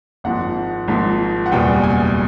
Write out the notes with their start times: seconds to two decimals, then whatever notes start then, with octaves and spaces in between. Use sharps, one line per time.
0.24 G#1 G#2 F3 F#5
0.88 G#1 G#2 F3
1.46 F#5
1.51 F#1 E2 B2 G3 G5
1.83 G#5